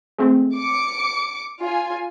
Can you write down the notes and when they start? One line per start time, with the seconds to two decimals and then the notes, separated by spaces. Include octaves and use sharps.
0.18 G#3 A3 C4
0.55 D6 C#7
1.61 F4 G#5